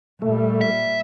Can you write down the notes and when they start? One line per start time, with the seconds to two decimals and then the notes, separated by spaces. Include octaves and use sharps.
0.22 A#2 G3 A3
0.61 E5